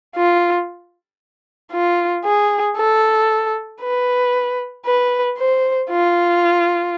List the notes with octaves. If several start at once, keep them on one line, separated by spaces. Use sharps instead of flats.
F4
F4
G#4
A4
B4
B4
C5
F4